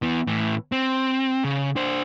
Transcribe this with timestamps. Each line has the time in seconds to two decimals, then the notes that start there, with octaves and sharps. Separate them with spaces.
0.02 E3 B3
0.27 A2 E3
0.72 C4
1.44 C#3
1.76 D4 C5